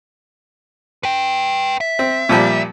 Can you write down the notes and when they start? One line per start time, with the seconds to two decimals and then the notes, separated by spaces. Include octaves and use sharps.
1.03 B4 G5
1.80 E5
1.99 C4
2.29 A#2 F3 G3